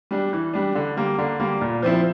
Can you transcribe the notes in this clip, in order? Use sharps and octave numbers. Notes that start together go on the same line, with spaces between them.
G3 D4
E3
G3 D4
D3
G3 A#3
D3
G3 A#3
A#2
F3 C4 E4